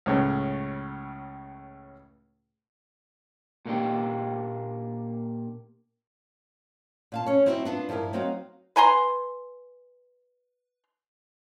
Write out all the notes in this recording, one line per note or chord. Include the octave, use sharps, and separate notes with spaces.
C#2 A2 C#3
A#2 A#3 D4 G4
A#2 F5 A5
C#4 C#5
C4 D#4 E4 F#4
B3 D4 F4
G2 F3 E4 G#4 A#4
F#3 C4 D#4 F#4 F5
B4 G#5 A#5 C6